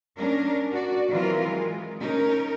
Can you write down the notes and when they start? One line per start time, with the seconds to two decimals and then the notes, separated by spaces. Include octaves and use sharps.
0.16 C#4 D4 A#4
0.71 F#4 D5
1.10 D#3 E3 F#3 C4 F4 A#4
1.43 G#3
2.01 C#4 D#4 A#4